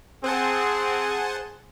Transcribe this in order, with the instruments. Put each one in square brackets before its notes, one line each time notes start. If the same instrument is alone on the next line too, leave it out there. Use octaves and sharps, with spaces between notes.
[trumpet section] C4 [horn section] G#4 [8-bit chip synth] C5 F#5 A5 [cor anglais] G#5